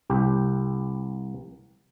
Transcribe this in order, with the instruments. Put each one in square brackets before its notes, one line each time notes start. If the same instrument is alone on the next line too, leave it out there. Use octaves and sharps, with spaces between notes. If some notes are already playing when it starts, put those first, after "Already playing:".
[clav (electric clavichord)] C2 G4